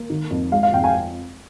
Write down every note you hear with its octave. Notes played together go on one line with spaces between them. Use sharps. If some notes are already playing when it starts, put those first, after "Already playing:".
Already playing: A#3
D#3
F2
G#3 F5
F5
F2 G5
G#5